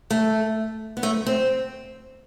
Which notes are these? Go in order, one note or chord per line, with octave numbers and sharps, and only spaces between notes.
A3
B3
A3
C4